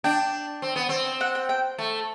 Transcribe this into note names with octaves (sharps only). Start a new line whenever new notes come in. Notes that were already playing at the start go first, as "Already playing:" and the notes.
D4 G5
C4
B3
C4
F#5
G5
G5
A3